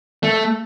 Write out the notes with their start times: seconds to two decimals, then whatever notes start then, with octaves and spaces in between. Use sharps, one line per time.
0.23 A3